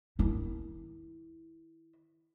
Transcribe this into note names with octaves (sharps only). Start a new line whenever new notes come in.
D#3 E4